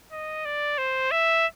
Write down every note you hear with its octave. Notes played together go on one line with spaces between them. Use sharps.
D#5
D5
C5
E5